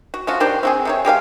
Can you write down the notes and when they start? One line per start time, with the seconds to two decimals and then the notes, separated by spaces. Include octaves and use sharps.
0.14 F#4
0.27 F3 C#4 F4 F#4
0.40 D#3 D4 G4 C5
0.63 C4 F#4 G#4
0.85 C3 D#3 C#5
1.05 G#3 G4 A#4 F5